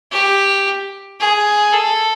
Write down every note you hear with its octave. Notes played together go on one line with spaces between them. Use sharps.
G4
G#4
A4